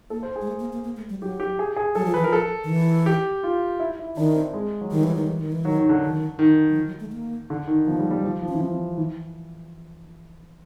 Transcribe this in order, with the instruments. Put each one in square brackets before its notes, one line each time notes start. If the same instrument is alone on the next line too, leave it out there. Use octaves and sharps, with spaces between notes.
[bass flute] A#3 [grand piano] A4
[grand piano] C5
G#4
[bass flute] G#3
A3
A#3
A#3
A#3
A3
G3
[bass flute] F#3 [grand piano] G4
[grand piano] G4
G#4
G#4
[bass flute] F#3 [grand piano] A4
[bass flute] F3
[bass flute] E3 [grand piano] B4
[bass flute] F3 [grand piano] A#4
[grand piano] A4
[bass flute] D#3
E3
[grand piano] G4
F4
E4
E4
[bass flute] D#3 [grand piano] D4
[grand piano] C4
G#3
F#3
[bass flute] D#3 [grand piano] G3
[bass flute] E3
D#3
E3
D#3
E3
[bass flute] D#3 [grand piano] F#3
[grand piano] D#3
D3
[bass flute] D#3
[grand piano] D#3
[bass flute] F#3
F3
F#3
A3
A#3
[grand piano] D3
D#3
[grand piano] F3 [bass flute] B3
[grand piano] G3
G3
F3
F3
[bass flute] C#4
[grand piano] E3
[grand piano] F3 [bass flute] C4
[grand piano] E3